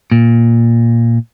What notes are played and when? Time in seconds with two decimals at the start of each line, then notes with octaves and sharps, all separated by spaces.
0.12 A#2